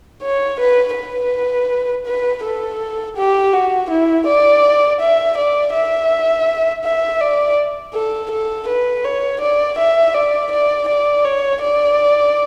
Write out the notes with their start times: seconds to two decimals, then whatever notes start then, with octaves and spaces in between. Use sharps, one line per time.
0.23 C#5
0.60 B4
0.96 B4
2.06 B4
2.43 A4
3.17 G4
3.53 F#4
3.90 E4
4.26 D5
5.00 E5
5.37 D5
5.74 E5
6.84 E5
7.21 D5
7.94 A4
8.31 A4
8.68 B4
9.04 C#5
9.41 D5
9.78 E5
10.14 D5
10.51 D5
10.88 D5
11.24 C#5
11.61 D5